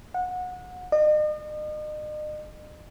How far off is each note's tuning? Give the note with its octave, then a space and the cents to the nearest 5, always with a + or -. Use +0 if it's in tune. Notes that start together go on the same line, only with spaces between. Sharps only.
F#5 -25
D#5 -40